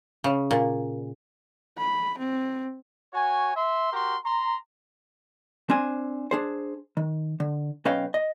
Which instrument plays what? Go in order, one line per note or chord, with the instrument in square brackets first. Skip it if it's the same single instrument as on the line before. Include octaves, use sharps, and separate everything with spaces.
[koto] C#3
A#2
[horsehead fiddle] B5
C4
[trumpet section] F#4 C#5 G#5
E5 C6
F#4 G4 A#4 C6
A#5 C6
[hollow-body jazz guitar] C4 D4 C5 G#5
D4 G#4 C5
D#3
D3
B1 C#4 B4 D#5 F5 G5
D#5